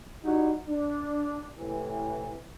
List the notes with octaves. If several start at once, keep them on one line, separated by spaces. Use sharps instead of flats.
G3 D#4 E4 F#4
D4
A2 C3 E3